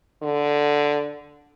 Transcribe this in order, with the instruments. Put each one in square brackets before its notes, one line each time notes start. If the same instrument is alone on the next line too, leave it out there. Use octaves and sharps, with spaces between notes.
[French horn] D3